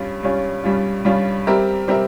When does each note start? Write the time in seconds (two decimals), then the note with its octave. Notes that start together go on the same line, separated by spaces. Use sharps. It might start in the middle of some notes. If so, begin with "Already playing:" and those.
Already playing: G2 G3 C#4 F4
0.23 G2 G3 C#4 F4
0.64 G2 G3 C#4 F4
1.05 G2 G3 C#4 F4
1.47 G3 C4 G4 A#4 E5
1.88 G3 C4 G4 A#4 E5